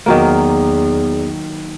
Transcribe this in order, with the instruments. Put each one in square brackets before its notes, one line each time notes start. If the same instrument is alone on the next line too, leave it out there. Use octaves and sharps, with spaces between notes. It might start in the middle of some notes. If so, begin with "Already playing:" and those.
[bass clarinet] E2 [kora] D#3 F#3 A#3